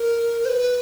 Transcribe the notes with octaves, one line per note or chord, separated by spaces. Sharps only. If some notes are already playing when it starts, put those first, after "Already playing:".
Already playing: A#4
C5
B4